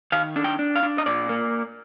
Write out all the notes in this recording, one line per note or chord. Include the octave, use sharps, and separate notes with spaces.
D#3 F5
D4
G5
D4
F5
D4
D#5
A#2 D5
A#3